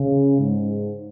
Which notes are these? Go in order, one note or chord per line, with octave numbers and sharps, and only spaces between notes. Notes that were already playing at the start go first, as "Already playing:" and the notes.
Already playing: C#3
G#2